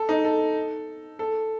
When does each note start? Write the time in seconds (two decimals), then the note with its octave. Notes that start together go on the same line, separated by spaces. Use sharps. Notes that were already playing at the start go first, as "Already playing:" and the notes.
Already playing: A4
0.09 D#4
0.25 A4
1.19 A4